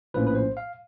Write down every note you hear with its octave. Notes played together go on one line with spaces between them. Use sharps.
A#1 A2 F3 A#3 C#4 B4
B4
C5
F5